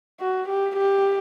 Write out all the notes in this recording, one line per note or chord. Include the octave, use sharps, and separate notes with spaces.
F#4
G4
G4